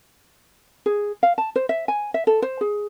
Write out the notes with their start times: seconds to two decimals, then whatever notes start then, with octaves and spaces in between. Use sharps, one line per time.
0.86 G#4
1.23 F5
1.38 A5
1.56 C5
1.69 E5
1.88 G#5
2.14 E5
2.27 A4
2.42 C5
2.61 G#4